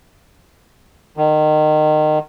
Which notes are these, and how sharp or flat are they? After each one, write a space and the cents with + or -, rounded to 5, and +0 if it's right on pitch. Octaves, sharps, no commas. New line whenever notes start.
D#3 -25